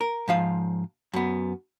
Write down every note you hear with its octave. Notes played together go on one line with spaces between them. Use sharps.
A#4
G#2 F3 F5
F#2 B3